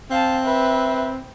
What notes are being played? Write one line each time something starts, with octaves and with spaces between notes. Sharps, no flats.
C4 F5 A5
B4 E5